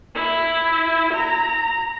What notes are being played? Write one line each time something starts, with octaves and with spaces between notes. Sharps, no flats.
E4
A#5